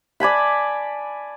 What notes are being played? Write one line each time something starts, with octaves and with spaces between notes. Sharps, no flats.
D5 G#5 A5 B5